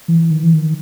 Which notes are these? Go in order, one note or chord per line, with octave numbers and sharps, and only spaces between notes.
E3
D#3
E3
D#3